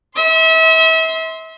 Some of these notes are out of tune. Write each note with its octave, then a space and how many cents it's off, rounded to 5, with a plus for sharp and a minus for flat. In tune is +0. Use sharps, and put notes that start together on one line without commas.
E5 -35 C6 +0